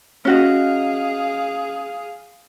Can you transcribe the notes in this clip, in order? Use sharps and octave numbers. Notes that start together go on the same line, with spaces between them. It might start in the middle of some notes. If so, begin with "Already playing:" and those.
C#4 F#4 G#4 D#5 F5